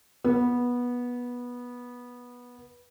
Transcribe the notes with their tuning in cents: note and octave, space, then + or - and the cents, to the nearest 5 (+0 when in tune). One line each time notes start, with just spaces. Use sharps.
B3 -15